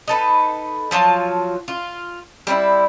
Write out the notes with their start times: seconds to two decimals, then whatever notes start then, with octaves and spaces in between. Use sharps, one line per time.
0.08 D#4 A4 B4
0.91 F3 F#3 F4 A5
1.68 F4
2.47 G3 C4 D#4 E4